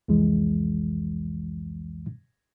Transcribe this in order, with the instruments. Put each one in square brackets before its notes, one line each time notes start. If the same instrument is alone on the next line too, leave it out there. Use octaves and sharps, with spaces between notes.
[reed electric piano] C2 F2 E3 G#3